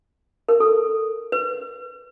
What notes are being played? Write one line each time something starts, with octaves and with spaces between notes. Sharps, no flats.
A#4
A4
B4